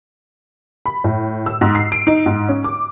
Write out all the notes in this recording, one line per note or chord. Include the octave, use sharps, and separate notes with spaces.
B5
A2
E6
G#2
C7
D7
D#4
G#2
C#4
D6